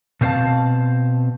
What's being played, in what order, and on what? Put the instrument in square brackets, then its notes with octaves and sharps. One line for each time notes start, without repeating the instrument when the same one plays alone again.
[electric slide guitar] B2 A3 C4 C5 F5 A5